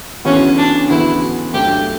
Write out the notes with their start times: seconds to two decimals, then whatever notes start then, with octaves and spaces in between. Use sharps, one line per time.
0.25 D2 C#3 E3 B3 C#4 F#4
0.58 D4
0.89 D2 C#3 E3 B3 E4 F#4
1.54 G2 F#3 A3 G4